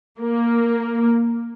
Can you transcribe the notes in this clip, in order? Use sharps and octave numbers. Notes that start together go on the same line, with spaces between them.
A#3